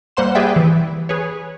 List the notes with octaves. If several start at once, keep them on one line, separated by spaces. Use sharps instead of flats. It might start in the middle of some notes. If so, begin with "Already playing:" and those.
G3 A#3 C5 F#5 C6 E7
G4 G#4 B4 D5 E5 G5
E3
G#4 B4 C#5